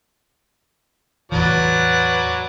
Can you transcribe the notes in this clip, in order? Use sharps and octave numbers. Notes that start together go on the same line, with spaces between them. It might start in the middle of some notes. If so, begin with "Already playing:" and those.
E2 A2 E3 F#3 B4 D5